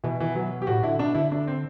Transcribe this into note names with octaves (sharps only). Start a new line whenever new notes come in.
B2 E3
E3
F#3
G4
A2 F#4
D3 E4
B2 D4
D3 E4
D4
C4